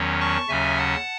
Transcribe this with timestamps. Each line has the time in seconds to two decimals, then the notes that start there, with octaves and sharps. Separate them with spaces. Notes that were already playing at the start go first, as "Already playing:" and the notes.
Already playing: E2 D#3 F#3 C#4
0.20 A5 C#6
0.48 D#2 C#3 F#3 C#4 E5 G#5
0.77 F#5 A5